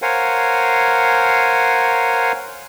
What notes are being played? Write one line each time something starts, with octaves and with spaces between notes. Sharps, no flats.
A#4 C5 C#5 F5 F#5 G#5